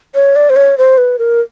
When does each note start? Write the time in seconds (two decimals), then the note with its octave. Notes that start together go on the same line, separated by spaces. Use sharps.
0.15 C#5
0.36 D5
0.50 C5
0.56 C#5
0.78 C5
0.98 B4
1.19 A#4